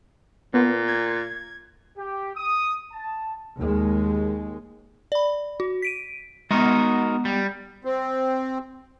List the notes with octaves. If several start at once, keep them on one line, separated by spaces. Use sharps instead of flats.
A#2 B3
G#6
G4
D#6
A5
D#2 G#3
D5 B5
F#4
B6 D7 D#7
G#3 B3 D#4 F#4 A#4
G3
C4